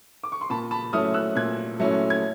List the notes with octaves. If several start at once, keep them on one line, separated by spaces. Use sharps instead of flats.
D6
C#6
C6
A#2 A5 B5
A5 B5
F#3 A3 C#4 E4 D#6 F6
E6 F#6
A#2 F#6 G#6
F#3 A3 C#4 E4
G#6